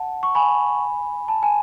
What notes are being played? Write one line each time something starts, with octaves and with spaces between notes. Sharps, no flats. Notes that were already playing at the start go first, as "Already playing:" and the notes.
Already playing: F#5 A5
C#6
G#5 B5
A5
G#5